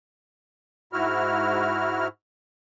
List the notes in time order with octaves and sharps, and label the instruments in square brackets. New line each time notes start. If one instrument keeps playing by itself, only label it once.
[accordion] G#2 E4 F#4 F6